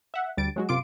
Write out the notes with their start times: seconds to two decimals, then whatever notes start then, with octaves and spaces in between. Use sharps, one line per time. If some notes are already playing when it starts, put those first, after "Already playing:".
0.14 E5 F#5
0.37 D2 G3 A6 D7
0.56 F#3 G#3 F#4
0.69 F#2 C3 F4 C6 D6 D7